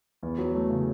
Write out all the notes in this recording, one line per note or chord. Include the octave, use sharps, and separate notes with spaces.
E2
F#3
A3
C#3